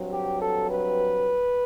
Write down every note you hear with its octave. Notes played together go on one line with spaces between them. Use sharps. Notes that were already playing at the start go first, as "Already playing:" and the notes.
Already playing: G2 F#3 C4
G4
A4
B4